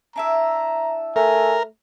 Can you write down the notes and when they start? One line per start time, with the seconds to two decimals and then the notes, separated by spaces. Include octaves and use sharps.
0.16 D4 E4 E5 A#5
1.16 A3 A#4 G#5